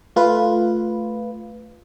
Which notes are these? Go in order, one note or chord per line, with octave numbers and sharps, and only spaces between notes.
A3 F4 B4